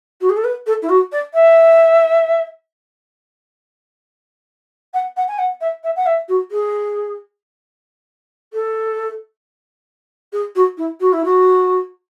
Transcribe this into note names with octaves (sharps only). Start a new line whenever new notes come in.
F#4
G#4
A4
B4
A4
E4
F#4
D5
E5
F#5
F#5
G#5
F#5
E5
E5
F#5
E5
F#4
G#4
A4
G#4
F#4
E4
F#4
E4
F#4